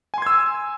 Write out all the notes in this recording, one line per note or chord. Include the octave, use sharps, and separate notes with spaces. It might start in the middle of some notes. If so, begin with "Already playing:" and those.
G#5 C6 E6 G#6